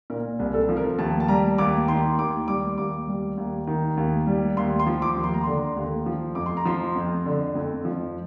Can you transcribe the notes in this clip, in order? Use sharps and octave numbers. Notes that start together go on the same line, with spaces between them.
A#2 A#4
C2
A4
F3
A#4
D#2 A5
A5
G3 A#5
D#2 D6
D#3 C6
D#2 D6
G3 D6
D#2 D6
G3
D#2
D#3
D#2
G3
D#2 C6
C6
F3
D6
D#2
C6
A#5
D3 C6
D#2
F3
F2 D6
C6
A#5
F3 C6
F2
D3
F2
F3